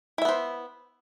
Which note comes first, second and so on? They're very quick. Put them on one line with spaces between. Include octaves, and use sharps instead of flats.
E4 E5 B3 C5